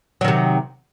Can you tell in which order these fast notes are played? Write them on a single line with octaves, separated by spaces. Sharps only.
F#3 D#3 C3